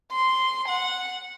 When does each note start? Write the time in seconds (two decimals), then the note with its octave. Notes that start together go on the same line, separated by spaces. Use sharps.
0.12 C6
0.69 F#5